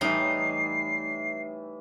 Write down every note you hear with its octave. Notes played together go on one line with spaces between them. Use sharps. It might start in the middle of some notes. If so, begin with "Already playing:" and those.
A2 E3 G3 D#4 C7